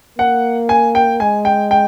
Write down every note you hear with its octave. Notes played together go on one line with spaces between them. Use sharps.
A#3 F#5
G#5
G5
G#3 G#5
G5
G5